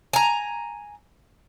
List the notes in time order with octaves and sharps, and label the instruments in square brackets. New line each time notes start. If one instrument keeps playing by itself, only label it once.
[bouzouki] G#5 A#5